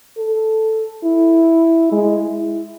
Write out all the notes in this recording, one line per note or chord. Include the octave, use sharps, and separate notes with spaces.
A4
E4
G#3
E4